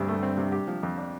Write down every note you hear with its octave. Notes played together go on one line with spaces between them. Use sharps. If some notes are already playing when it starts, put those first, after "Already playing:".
Already playing: D2 G2 C3 C4
A3
C4
C3
G4
F3
F2
D4